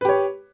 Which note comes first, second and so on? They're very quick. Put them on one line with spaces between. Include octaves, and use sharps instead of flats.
B4 G4 C#5